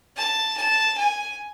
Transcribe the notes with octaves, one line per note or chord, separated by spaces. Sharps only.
A5
A5
G#5